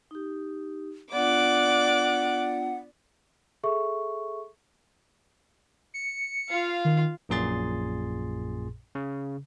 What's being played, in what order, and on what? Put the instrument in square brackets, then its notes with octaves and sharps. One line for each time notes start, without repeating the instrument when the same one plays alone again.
[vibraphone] D#4 G4
[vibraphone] B3 D4 F4 [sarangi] D5 [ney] F#5 [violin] D6 F#6
[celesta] G#4 A4 E5 C#6
[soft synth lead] C#7
[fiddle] F4 F5
[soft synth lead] D#3
[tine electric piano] A#1 F#2 A#2 G#4 C6 A6
C#3